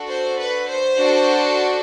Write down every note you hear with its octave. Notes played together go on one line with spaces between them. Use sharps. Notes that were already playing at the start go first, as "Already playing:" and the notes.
Already playing: D4 F#4 A4
C5
B4
C5
D4 F#4 A4